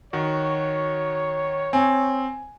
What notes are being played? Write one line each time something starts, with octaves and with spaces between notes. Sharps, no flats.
D#3 F#4 C#5
C4 G#5